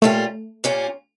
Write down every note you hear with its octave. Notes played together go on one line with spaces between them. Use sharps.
A#2 G3 A3 C#4 F4
A#2 G3 C#4 F4